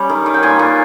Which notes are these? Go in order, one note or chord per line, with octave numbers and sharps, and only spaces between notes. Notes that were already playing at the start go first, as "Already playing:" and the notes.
Already playing: G3 C#4
D#3
D#3
G5
A#2 G#5
A#2